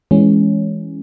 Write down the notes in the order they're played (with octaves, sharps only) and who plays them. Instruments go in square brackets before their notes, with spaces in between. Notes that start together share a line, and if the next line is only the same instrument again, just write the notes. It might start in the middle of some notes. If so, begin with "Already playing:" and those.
[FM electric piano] E3 G#3 C#4